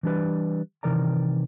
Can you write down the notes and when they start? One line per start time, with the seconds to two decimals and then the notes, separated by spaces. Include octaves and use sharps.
0.03 E3 G3 D4 G4 B4 D5
0.83 C3 D#3 E3 A#4 D5 A#5